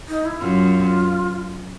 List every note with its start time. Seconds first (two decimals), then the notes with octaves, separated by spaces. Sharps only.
0.08 D#4
0.25 E4
0.41 F#2 F4